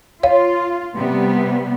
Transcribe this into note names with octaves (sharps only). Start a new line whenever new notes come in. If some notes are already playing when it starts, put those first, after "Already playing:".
F4 C#5 F5
C3 G3 B3